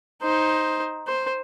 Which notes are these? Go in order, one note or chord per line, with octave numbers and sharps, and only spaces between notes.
D#4 C5
C5